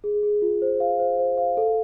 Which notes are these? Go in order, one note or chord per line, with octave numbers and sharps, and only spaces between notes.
G#4
G#4
F4
C5
F5
C5
C5
F5
A4